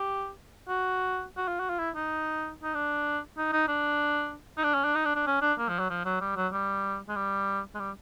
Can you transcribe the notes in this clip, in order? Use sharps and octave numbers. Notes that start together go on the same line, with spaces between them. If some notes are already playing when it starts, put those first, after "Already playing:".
Already playing: G4
F#4
F#4
F4
F#4
F4
E4
D#4
D#4
D4
D#4
D#4
D4
D#4
D4
C#4
D4
D#4
D4
D4
C#4
D4
A#3
F3
F#3
F3
F#3
G3
F#3
G3
G#3
G3
G#3
G3